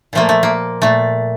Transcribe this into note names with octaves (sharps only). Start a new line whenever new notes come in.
A#2 F3 A3 A#3
A3
A#3
A#2 A3